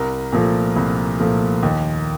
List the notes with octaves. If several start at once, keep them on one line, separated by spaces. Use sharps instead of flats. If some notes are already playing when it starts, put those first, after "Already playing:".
Already playing: C2 A#4
A#2 F3 A3
C2
A#2 F3 A3
D#2